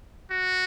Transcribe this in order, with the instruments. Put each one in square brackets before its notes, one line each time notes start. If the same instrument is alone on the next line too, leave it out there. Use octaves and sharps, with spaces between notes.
[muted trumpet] F#4